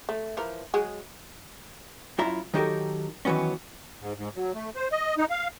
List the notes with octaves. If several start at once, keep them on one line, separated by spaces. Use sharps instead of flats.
A3
E3 F3 A#4
F#3 G#3 G#4
F#2 E4 F4 E5 A#5
D#3 F#3 D#4 G4 A4 A#4
D#3 E3 F#3 B3 C#4
G#2
G#2
F#3
A3
C5
D#5
D#4
F5